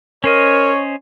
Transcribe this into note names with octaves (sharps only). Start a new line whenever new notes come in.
C#4 A#4 C5 C#5 D#5